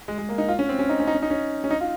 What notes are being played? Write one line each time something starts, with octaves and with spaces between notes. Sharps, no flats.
G#3
G#3
A#3
D#4
F4
C#4
C4
C#4
D#4
C#4
D#4
C#4
D#4
C#4
C#4
D#4
F4